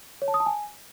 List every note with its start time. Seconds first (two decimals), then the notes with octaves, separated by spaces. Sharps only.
0.22 C#5
0.28 A5
0.34 D#6
0.40 A5
0.46 G#5